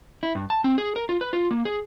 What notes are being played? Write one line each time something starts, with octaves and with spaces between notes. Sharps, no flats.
E4
G2
A5
C4
G#4
A#4
F4
B4
F4
A#3
G#4